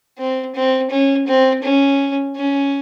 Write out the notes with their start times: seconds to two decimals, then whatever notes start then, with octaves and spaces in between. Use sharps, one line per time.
0.19 C4
0.56 C4
0.91 C#4
1.27 C4
1.63 C#4
2.36 C#4